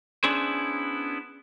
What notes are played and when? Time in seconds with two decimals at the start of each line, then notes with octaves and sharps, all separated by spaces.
0.24 B3 C#4 D4 E4 G#4 C5